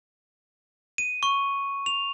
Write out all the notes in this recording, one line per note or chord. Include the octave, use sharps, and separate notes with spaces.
D#7
C#6
F7